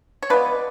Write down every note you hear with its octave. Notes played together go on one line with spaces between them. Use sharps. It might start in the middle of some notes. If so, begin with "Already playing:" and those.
C#5
F3 G#3 B3 B4 D5